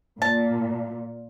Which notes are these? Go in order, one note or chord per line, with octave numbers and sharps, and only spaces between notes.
A#2 A5